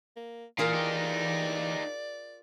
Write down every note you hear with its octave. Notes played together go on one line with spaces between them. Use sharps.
A#3
A#2 E3 F4 G#4 A#4 D5
D#4 G4